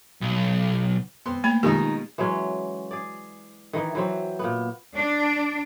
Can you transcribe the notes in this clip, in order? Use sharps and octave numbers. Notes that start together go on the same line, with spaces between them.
B1
B3 C4 C6
A3 A#3 B5
B2 D#3 F3 G#3 D#4 G4
E3 F#3 G#3 C#4
G#4 D5
D#3 E3 D#4
E3 F#3 C4
A#2 B3
D4